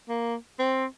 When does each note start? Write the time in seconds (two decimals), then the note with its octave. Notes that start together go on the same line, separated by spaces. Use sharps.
0.09 A#3
0.59 C4